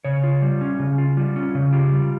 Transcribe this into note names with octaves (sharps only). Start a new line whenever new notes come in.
C#3 C#5
F4
G3
C#4
C#3
F4
G3 F4
C#4
C#3
F4 G4
G3